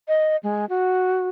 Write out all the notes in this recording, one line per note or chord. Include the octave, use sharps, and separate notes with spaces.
D#5
G#3
F#4